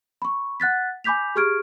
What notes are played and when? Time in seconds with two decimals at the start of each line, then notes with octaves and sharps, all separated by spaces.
0.22 B5 C#6
0.60 F#5 F#6 A6 B6
1.04 G#5 B5 D6 G6 B6 F7
1.35 G4 G#4 C#6 F6 G#6 D7